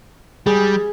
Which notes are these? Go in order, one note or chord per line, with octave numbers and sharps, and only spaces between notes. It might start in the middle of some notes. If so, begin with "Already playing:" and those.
G3 G#4